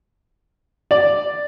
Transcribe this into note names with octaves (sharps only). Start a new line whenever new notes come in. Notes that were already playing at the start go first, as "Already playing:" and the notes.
D5